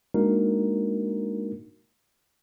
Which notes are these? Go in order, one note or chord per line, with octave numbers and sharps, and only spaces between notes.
G#3 A#3 D4 D#4 F#4 A#4